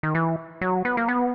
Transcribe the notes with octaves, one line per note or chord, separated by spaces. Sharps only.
D#3
E3
F#3
B3
A#3
B3